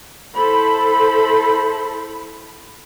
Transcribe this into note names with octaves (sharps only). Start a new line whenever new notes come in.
E4 A4 C5 B5